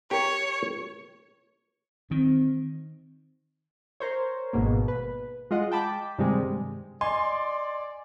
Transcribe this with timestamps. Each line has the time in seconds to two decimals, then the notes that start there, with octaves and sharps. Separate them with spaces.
0.11 G4 A#4 C#5
2.11 D#3 C4
4.00 A#4 C5 C#5
4.53 G#1 G#2 B2 A#3
4.88 B4
5.51 G#3 F4 D#5 F#5
5.72 G5 A5 B5 D6
6.18 G2 C3 D#3 G3 G#3
7.01 D5 D#5 G#5 C6